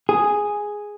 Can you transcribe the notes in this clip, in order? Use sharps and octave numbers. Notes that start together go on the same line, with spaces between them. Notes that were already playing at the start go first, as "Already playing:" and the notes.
G#4